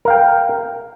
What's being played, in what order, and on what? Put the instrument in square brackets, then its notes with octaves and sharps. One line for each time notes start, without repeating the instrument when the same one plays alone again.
[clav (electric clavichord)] A#4
F5
G5